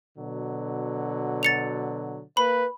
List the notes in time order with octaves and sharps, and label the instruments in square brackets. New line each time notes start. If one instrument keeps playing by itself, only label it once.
[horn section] B2 D3 F#3
[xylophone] A6 C#7 F7
[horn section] A#3 B4 [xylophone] B5